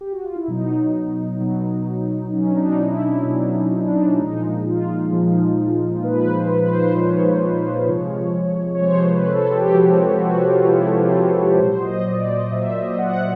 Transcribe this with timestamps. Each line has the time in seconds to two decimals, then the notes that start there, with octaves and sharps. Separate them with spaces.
0.01 G4
0.13 F#4
0.25 F4
0.36 E4
0.48 B2 F#3 D#4
1.41 B2 F#3
2.33 B2 F#3 C#4
2.51 D4
2.56 D#4
2.79 E4
3.03 E4
3.25 B2 F#3 D4
3.80 D#4
3.87 D4
4.19 A#2 F3 G#3 D#4
4.65 F4
5.12 A#2 F3 G#3
6.03 A#2 F3 G#3 B4
6.27 C5
6.50 B4
6.73 C5
6.96 A#2 F3 G#3 C#5
7.88 C3 F3 G#3
8.75 C#5
8.81 C3 F3 G#3 C5
9.04 B4
9.27 A4
9.51 G4
9.73 C3 F3 G#3 F#4
10.20 F#4
10.44 F4
10.67 C3 F3 G#3 E4
10.98 F4
11.59 A#2 F#3 C5
11.82 D#5
12.05 D5
12.28 D#5
12.51 A#2 F#3 E5
12.75 D#5
12.98 F#5